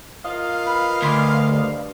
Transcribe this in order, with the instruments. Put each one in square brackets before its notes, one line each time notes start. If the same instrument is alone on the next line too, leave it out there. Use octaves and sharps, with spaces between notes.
[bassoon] F4 [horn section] A#4 D#5 F5
[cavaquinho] B4
[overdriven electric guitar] D2 [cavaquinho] B4 C6 D6
[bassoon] G2